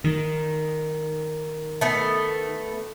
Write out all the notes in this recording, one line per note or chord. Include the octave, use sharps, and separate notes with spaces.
D#3
A3 B3